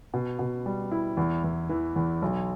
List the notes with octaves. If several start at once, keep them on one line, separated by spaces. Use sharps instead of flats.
B2
B2
G3
E4
E2
E2
E3
E2
B1